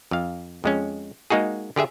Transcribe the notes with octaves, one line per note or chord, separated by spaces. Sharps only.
F2 F5
F2 G#3 C#4
G#3 A#3 D#4 F#4 G#4
D3 G4 G#4 E5